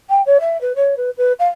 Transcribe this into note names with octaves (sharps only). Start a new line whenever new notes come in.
G5
C#5
E5
B4
C#5
B4
B4
F5